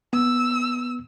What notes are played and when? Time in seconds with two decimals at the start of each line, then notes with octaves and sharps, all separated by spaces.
0.13 B3 E6